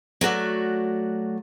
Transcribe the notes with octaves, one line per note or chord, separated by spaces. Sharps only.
F#3 A3 F#4 D5